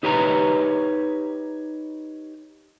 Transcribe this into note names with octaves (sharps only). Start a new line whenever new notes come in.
D#4 G4 B4 C#5 A#5